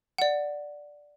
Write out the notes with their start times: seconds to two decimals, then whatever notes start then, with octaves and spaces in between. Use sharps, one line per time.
0.18 D5 F#5